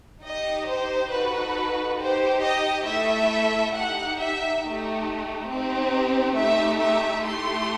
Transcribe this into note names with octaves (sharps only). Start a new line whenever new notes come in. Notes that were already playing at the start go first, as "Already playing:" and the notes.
D#4 G4 D#5
C5
D#4 F#4 A4 B4
D#4 G4 C5
D#5
A3 E4 A4 E5
D#4 G4 F#5
E5
A3 D#4 G4
C4 D#4 G4
A3 D#4 G4 E5
E5
A3 E4 G4 C6